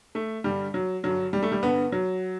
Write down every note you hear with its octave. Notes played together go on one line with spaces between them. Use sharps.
A3
G2 D3 G3
F#3
G2 D3 F#3
G3
A3
G3
G2 D3 B3
F#3